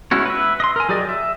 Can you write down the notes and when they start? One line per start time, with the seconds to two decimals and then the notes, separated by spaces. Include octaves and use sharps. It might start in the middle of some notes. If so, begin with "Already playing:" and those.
0.11 G#3 C#4 E4 F#4 C#5
0.26 B4 E5
0.60 D#5 C6
0.76 A#4 G#5
0.89 F#3 G4 G#4 D5 D#5
1.09 E5